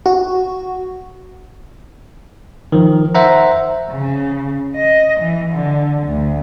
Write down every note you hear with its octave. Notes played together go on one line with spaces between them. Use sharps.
F#4
D#3 F3
C5 E5 F#5 A#5
C#3
D#5
E3
D3
D2